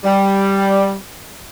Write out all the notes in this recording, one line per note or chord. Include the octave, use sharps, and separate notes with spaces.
G3